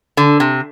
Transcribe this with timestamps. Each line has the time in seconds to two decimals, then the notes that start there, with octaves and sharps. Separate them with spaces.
0.17 D3
0.40 C3